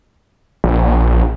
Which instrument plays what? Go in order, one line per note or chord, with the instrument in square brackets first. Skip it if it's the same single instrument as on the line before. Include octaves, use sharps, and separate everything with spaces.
[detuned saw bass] A#1